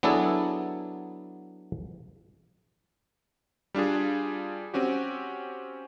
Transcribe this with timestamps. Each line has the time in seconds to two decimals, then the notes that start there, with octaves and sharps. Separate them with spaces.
0.03 F#3 B3 D4 E4 G#4 A4
3.74 G3 D4 F4 G#4
4.74 C4 C#4 F#4 G4